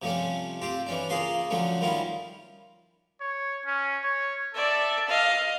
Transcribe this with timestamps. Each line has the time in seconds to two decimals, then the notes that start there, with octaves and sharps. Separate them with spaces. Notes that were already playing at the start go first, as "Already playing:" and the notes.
0.02 C3 F3 G3 A3 C#4
0.62 C4 F4 G4
0.86 E3 C#4 D4
1.09 C#3 A#3 F4 G#4 C6 D#6
1.50 D3 F3 F#3 A3 C#4
1.81 D#3 G3 C#4 E4 F4
3.21 C#5
3.66 C#4
4.04 C#5
4.55 A4 D5 E5
5.09 D#5 F5